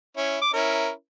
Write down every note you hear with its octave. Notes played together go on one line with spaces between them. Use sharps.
C#4 E4
D6
C#4 E4 A#4